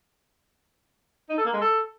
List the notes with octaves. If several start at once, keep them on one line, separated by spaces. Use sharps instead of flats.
D#4
A4
A#3
G#3
A4